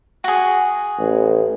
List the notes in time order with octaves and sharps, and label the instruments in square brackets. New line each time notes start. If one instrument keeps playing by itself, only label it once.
[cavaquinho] F#4 G#4
[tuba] A1